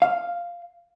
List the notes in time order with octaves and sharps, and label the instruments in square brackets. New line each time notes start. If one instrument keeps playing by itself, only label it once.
[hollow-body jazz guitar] F5